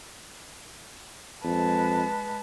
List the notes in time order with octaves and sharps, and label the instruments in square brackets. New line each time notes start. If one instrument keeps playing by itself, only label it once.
[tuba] F2 [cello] G#3 B4 [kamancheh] A5